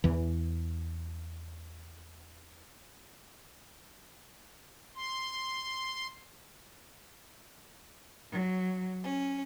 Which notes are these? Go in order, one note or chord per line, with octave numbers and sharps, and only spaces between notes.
E2 E3
C6
F#3
C#4